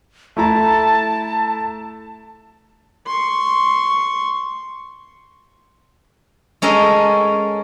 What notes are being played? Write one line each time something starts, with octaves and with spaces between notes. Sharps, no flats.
A3 E4 A5 A#5
C6 C#6
G#3 C#4 A4 A#4 D#5